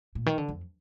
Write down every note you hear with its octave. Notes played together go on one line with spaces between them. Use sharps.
A#2
D#3
D3
F2